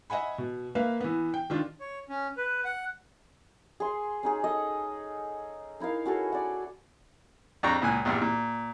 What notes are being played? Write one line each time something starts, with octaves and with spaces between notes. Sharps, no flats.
D#5 E5 F#5 G#5 B5
B2
A#3 B4 E5 F5
E3 B3
G5
D#3 D4 F4
C#5
C#4
B4
F#5
G#4 C6
C#4 D#4 G#4
G#4 A4 D#5
D#4 E4 A#4 F5
C#4 F#4 G#4 A4
D5 F#5
F2 D4 G5 A#5 C#6
C#2 A#2 G#5 F#6
A#1 E2 G2
A#2